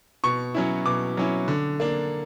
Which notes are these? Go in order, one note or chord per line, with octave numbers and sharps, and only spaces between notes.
B2 C#6
F#3 C#4 E4
B2 D6
F#3 C#4 E4
D3
A#3 D4